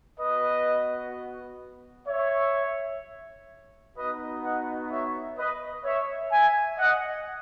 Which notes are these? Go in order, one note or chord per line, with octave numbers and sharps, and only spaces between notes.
B3 F#4 B4 D#5
C#5 E5
B3 D#4 F#4 B4 D#5
D#5 F#5
C#5 E5
B4 D#5
C#5 E5
E5 G#5
D#5 F#5